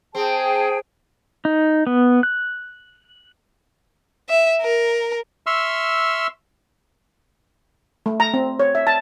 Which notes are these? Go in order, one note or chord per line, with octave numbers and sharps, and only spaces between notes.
C4 G#4 G5 A5
D#4
B3
F#6
E5
A#4
E5 C6 C#6 E6 F6
A3
A#5
C4
C#5
E5
A5